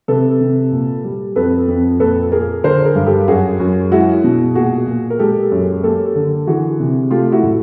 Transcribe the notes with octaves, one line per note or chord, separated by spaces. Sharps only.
C3 A4 B4
C3
A#2
G3
F2 A4 B4
F2
A#2 A4 B4
A#3 G#4 A#4
D3 A#4 C5
G#4 A#4
G2
G4 A4
F#2 F#4 G#4
F#2
G#3 E4 F#4
B2
A#2 F#4 G#4
A#2
A#4
G#3 G4 A4
F#2
A#3 G4 A4
D3
E3 F#4 G#4
C3
A3 F4 G4
E4 F#4
A2